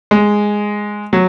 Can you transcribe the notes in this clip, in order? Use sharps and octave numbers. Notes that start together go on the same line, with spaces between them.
G#3
F#3